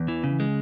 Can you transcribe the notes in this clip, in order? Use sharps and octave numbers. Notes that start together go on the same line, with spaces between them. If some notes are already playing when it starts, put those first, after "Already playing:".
Already playing: E2
E3
C#3
G#3